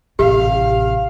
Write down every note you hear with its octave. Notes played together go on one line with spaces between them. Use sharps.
A1 C3 G4 F5